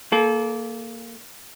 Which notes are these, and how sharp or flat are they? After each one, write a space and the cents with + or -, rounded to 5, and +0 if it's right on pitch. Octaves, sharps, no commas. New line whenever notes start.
A#3 -5 A4 -35